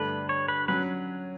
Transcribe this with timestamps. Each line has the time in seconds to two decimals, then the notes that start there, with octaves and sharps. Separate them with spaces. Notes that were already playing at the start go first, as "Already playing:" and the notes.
Already playing: G2 D3 A3 D4 B4
0.29 C#5
0.48 B4
0.68 F#3 C#4 B4